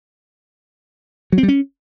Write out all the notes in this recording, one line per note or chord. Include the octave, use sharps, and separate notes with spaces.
F#3
C4
G3
C#4